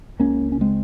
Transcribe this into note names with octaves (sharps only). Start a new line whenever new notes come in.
C#2 C#3 A#3 C#4
C#4
G#3 C4